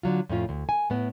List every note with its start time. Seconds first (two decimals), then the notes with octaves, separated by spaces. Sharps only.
0.03 D3 F#3 F4
0.29 F2 A2 C#4 F4
0.49 D2
0.69 G#5
0.90 A2 B3